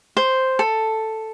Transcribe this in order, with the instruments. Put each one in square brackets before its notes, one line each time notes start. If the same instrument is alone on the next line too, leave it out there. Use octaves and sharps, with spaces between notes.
[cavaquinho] C5
A4